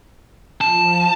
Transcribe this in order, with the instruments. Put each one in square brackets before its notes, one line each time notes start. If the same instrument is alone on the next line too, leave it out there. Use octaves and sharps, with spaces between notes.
[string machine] F3 [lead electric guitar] A5